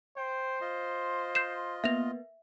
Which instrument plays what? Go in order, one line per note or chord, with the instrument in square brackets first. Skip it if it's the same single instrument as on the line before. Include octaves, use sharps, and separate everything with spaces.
[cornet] C5 [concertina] G5
[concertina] F4 D#5
[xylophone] G6 C7 E7
[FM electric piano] A#3 B3 [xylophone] E5 A#6 F7